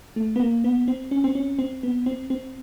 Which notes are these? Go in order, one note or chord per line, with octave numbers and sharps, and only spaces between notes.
A3
B3
A#3
B3
C4
C#4
C4
C#4
C4
B3
C4
C4